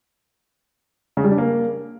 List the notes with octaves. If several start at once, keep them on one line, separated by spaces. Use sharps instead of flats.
C#3
G3
D4
A#3